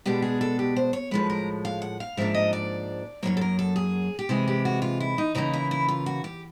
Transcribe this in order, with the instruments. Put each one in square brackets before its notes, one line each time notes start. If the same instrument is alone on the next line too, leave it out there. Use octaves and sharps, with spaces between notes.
[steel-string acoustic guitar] B2 G#3 B3 D4 G4
G#4
A4
G4
C5
C#5
A2 F3 G#3 B4
A#4
F5
F#5
F5
G#2 F3 A#3 D4 E5
D#5
D5
F#2 C#3 F#3 A#3 C#5
A4
A#4
A4
G#4
G4
C3 E3 G#3 G#4
G4
F#4
F4
E4
D#4
C#3 E3 G3 A#3 D#4
E4
E4
F4
F#4
G4